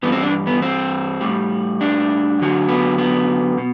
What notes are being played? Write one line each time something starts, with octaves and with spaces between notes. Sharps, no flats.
G2 E3 G3 B3
C4
D4
B3
C4
A2 G3
D4
F#2 D3 F#3
B3
B3
B2